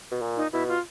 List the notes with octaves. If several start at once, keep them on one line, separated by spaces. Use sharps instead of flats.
B2
A#2
D#4
B2 E4
F4